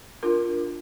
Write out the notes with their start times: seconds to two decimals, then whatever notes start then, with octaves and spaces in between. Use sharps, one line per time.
0.23 D4 F4 A#4